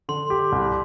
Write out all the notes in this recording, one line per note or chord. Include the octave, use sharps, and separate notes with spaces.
D3 C6
G4
C2